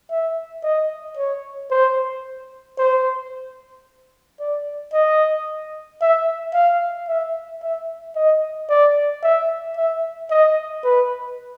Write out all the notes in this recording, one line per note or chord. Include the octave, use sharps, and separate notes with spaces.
E5
D#5
C#5
C5
C5
D5
D#5
E5
F5
E5
E5
D#5
D5
E5
E5
D#5
B4